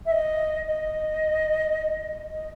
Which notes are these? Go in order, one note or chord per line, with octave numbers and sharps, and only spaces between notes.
E5
D#5
D#5
D#5